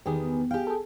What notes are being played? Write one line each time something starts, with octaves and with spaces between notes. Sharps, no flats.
E2 D#3 B3 G4 G#4
G4 G#4 F5 G5
G#4 A4